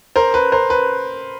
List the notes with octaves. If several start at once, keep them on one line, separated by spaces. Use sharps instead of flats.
A#4 C5
B4
A#4 C5
B4